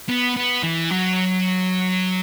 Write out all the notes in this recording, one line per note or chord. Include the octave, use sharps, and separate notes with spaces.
B3
B3
E3
F#3